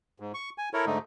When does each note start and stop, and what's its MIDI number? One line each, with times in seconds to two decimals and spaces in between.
0.20 0.32 44
0.34 0.50 85
0.58 0.69 80
0.74 0.85 64
0.74 0.85 69
0.74 0.85 70
0.74 0.85 73
0.86 0.98 44
0.86 0.98 50
0.86 0.98 57
0.86 0.98 63